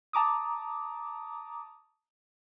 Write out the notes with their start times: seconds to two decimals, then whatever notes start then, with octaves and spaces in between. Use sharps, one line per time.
0.13 A5 A#5 D6 D#6